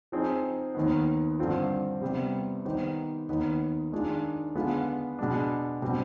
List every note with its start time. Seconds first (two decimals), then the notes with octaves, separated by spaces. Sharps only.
0.12 F3 C4 D#4 G#4 C5
0.75 D#2 D#3 B3
1.39 G2 D3 F3 C4 F4
2.01 C3 G3 B3
2.65 D#3 B3 D#4 G4 C5
3.29 D#2 D#3 B3 D#4 B4
3.92 D#3 G#3 D4 F4
4.55 D3 G#3 B3 F4
5.19 B2 G#3 D4
5.82 B2 G3 C4